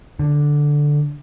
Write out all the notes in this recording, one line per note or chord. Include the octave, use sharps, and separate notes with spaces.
D3